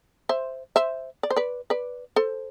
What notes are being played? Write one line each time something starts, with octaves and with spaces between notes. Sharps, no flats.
C5 E5
C5 E5
D5
C5
B4 D5
B4 D5
A4 C5